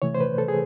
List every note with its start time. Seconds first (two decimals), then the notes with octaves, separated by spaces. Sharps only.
0.02 C3 E3 A3 C#5
0.15 C5
0.20 B4
0.38 A4
0.48 G#4